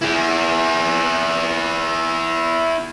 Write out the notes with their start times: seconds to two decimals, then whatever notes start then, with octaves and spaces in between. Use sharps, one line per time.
0.01 E4 G#4